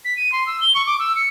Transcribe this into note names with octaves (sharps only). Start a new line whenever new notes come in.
B6
D#7
C6
E6
G7
C#6
D6
E6
C#7